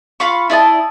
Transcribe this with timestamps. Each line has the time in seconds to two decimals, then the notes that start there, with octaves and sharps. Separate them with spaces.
0.20 F4 F5 B5 C#6
0.50 E4 D5 D#5 A5